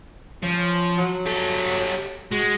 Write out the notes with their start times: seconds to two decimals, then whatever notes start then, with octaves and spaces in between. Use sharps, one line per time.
0.43 F3 C#4
0.97 F#3
1.26 G3 A4
2.31 G#3 F#4